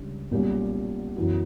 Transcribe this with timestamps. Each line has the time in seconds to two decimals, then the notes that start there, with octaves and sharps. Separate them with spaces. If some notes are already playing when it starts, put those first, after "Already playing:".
Already playing: C#2 C#3 G3 D4
0.31 B1 A#2 G3 C#4 G4
1.16 F#2 E3 B3 F#4